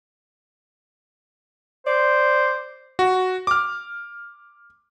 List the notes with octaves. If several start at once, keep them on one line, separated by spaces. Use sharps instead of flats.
C5 D5
F#4
D6 F6